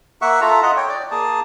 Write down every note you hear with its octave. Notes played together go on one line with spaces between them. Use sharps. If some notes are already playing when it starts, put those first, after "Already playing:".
A#3 E5 F#5 C#6
F4 A4 E5 A#5
F4 D#5 F#5
C#5 G5
D5
A#3 G#4 A5